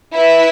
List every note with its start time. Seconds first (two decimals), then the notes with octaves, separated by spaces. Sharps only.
0.13 E4 B4 E5